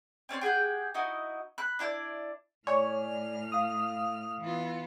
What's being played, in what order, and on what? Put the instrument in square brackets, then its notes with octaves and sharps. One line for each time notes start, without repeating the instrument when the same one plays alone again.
[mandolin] C4 C#4 D5 C6
G4 G#4 F#5 G5
D#4 E4 F#4 D#5
B5 F#6
D4 E4 C5 D5
[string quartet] A2 F6 [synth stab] C#5 [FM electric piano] D5 G#5
[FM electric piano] F5 D#6
[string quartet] E3 B3 F4